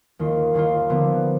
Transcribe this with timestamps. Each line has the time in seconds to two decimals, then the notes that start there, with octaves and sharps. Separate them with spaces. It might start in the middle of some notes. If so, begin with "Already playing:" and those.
0.19 D#2 D#3 A#3 F4
0.54 D#2 D#3 A#3 F4
0.89 D3 F3 B3